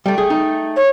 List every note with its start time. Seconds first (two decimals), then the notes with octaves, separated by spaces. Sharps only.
0.06 G3 A3 G5
0.18 G#4
0.30 D#4
0.76 C#5